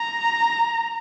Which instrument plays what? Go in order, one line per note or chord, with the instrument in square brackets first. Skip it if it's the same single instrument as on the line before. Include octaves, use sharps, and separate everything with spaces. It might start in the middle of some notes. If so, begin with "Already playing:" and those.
Already playing: [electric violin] A#5